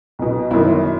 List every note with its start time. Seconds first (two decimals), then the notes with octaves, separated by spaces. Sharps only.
0.19 B1 B2
0.51 G1 F#2 D#3 E4